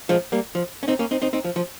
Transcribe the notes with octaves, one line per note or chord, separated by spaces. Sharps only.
F3 G#3
G3 A#3
F3
C#4
C4 D#4
A#3 C#4
C4 D#4
C4 D#4
C4 D#4
F3
F3